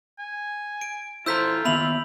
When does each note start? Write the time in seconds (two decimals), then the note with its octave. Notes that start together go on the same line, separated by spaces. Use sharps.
0.19 G#5
0.81 D7
1.26 E4 F4 A4 C5 A#5 E6 G6 B6
1.65 D#3 A#3 B3 E5 B5 F7 F#7